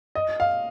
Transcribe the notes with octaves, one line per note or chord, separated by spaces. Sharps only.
D#5
F5